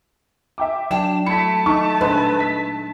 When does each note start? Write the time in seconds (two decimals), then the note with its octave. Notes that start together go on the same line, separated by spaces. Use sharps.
0.58 E5 G5 D6
0.91 F#3 D4 G5 E7
1.26 A3 E4 A5 B6 C#7
1.66 D#4 C#6
2.01 A#2 G#3 D4 B4
2.40 B6